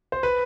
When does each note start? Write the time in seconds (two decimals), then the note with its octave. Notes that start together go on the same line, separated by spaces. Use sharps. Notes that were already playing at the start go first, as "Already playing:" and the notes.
0.12 C5
0.23 B4